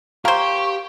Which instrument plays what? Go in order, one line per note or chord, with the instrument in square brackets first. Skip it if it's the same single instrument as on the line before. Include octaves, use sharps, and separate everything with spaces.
[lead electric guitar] G4 [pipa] A#4 C5 [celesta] F5 [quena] C#6